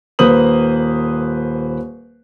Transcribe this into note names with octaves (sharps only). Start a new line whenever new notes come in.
D#1 A#3 B4 C5 D#6 F#7